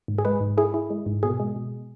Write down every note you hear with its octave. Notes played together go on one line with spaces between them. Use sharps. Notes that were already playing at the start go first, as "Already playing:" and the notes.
G#2
G#4
G#3 B4
G#2
E4 G#4
E4
G#3
G#2
B2 G#4
G#3
B2